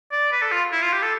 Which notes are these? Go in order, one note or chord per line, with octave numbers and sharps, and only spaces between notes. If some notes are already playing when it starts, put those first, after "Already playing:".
D5
B4
A4
F4
E4
F4
G4
A4